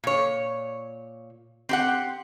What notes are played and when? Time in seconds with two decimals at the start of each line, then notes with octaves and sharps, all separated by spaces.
0.04 A#2 C#5
1.69 C4 G4 F#5